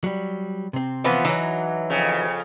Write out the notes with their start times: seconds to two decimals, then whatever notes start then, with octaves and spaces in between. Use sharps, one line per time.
0.04 F#3 G3
0.73 C3 C4
1.04 E3 F3 B3
1.25 E3 F#3 D#4
1.90 F2 C#3